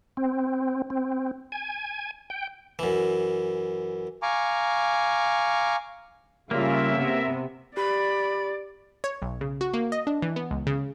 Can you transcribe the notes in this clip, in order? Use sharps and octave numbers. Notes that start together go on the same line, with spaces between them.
C4
C4
G#5
G5
F#2 E3
F5 G#5 A#5 C#6 D6
C#3 G3 A#3 F4 A#4 E5
C3 B3
G4 D5 B5
C#5
B1
C#3
F#4
A#3
D#5
D4
E3
B3
C#2
C#3